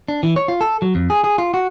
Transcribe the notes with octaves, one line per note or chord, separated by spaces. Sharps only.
D4
E3
C#5
F4
A4
F#3
F2
G#4
G#4
F4
F#4